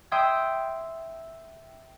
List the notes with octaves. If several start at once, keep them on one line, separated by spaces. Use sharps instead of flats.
E5 G5 C6 D#6 E6 G#6